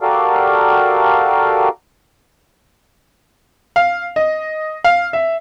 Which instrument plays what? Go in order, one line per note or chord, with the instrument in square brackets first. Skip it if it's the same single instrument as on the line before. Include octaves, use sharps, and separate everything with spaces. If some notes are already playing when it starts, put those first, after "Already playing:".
[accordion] F#4 G4 A4 A#4 D5 F5
[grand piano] F5
D#5
F5
E5